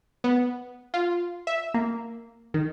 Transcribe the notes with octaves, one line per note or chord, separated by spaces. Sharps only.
B3
F4
E5
A#3
D#3